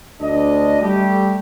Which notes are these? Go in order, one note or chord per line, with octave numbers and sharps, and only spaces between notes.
D2 D4 D#5
G3 A3 G4